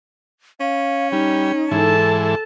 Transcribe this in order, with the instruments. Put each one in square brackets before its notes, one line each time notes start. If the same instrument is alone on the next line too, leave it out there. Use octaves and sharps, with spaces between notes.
[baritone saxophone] C#4 [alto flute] F5
[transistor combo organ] G3 [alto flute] D#4
[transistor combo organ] G#2 E3 [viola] A4 A5